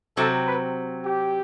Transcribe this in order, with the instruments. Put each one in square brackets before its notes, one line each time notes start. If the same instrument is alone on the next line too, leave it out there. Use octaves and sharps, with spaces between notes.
[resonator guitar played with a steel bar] C3 F#3 C4 [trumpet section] A4
[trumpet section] B4
G4